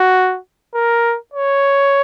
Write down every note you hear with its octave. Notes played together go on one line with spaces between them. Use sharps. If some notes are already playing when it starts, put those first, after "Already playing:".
Already playing: F#4
A#4
C#5